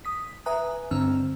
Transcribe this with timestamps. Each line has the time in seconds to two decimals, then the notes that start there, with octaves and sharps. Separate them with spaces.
0.05 D#6 B6
0.46 B4 E5 G#5 A#5 D#6 F#6
0.91 G2 D3 C4 A#5 E6 F6